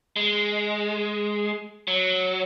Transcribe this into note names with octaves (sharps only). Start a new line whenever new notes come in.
G#3
F#3